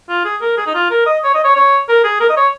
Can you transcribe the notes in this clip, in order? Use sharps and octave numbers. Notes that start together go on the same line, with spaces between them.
F4
G#4
A#4
G#4
D#4
F4
A#4
D#5
C#5
D#5
C#5
C#5
A#4
G#4
A#4
D#5
C#5